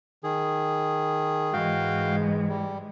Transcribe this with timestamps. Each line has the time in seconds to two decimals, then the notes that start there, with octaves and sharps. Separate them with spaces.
0.24 D#3 G#4
1.53 G#2 E3 G#3 F#4 F5 G5
2.49 G3